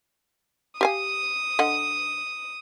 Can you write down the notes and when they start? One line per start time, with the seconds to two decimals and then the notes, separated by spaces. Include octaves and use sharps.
0.81 G4 F5 G#5 D#6
1.59 D3 D#5 F#5